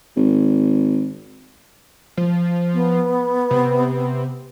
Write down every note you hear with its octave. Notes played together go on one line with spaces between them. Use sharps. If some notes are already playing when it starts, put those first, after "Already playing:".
G#1
F3
B3
C3